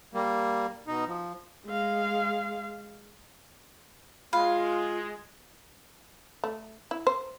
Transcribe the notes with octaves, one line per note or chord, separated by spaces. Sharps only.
G3 A#3
B2 D#4
F3
G#3 F5
G#3 F4 F5 B5
A3
E4
C5